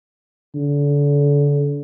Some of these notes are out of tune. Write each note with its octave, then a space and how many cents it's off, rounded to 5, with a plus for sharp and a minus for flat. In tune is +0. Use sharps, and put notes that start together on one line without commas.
D3 -30